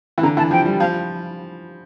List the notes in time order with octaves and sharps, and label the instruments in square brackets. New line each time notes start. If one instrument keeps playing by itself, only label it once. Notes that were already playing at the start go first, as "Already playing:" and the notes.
[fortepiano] E3
[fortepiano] D3 [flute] A#5
[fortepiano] E3 [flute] A5
[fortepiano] F3 [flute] G5
[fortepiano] G3
[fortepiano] F3 [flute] F5